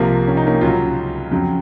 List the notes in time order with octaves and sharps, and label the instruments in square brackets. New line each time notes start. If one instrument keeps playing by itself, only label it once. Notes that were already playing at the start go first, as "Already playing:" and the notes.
Already playing: [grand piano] C2 C3 F3 A#3
C#4
D#4
A#3 C#4
C#2 C#3 F#3 C#4 F4
F2 C#3 F#3